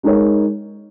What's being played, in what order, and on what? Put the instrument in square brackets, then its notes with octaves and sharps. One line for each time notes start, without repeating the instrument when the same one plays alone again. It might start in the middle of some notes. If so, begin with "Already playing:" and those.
[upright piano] G#3 D#4 A#4 C#5